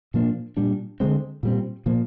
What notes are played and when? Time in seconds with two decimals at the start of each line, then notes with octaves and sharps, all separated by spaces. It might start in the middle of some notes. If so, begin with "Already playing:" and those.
0.14 A#2 F3 A#3 D4
0.57 A#2 G3 D4
1.00 D3 F3 G#3 C4
1.43 A#2 G3 C4
1.86 A#2 F3 A#3